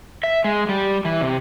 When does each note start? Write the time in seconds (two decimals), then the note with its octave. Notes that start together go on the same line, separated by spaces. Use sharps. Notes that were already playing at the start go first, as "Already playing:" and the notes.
0.23 E5
0.44 G#3
0.69 G3
1.05 E3
1.21 C3